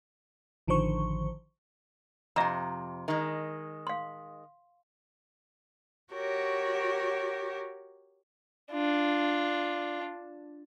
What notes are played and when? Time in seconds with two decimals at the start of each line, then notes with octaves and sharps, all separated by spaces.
0.68 A1 D3 D#3 F3 C5 C#6
2.36 F2 C3 E5 A#5
3.08 D#3 G#3
3.87 F5 C6
6.14 F#4 G4 A#4 C#5
8.72 D4 F4